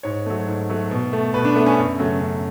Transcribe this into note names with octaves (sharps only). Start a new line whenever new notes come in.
G#2 C#5
F#3 A3
G#2
F#3 A3
B2
A3
B2 B4
D4
A3 B3
C#4
F#2
C#3 F#3 A3
F#2